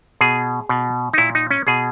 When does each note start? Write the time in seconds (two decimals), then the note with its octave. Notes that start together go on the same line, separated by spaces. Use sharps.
0.21 B2 G#4
0.69 B2
1.13 D#4
1.18 A#2 E4
1.35 D#4
1.51 C#4
1.67 B2 G#4